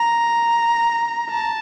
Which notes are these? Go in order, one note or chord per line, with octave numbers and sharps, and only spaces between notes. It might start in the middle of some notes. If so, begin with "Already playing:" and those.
Already playing: A#5
A5